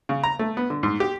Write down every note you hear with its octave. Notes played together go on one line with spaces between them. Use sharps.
C#3
A#5
A3
B3
D3
G#2
G4